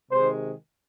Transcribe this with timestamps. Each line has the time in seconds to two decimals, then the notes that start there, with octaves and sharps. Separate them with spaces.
0.11 C3 D#3 G#3 C5